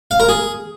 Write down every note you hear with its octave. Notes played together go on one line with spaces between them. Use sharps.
F5
A#4
G#4